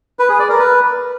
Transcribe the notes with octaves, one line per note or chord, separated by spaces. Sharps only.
B4
G#4
D5
A#4
B4